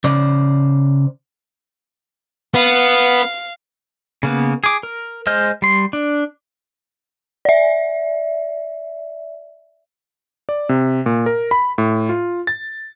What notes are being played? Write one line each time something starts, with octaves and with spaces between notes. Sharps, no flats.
C#3 C5 D5
B3 F5
C#3 A#3 B3
G#4 D6
A#4
G#3 C5 D#5 F6 G6
G3 C6
D4
D5 E5
D5
C3
A#2
A#4
B5
A2
F4
A6